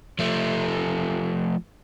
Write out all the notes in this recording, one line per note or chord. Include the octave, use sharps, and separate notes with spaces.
F3 A3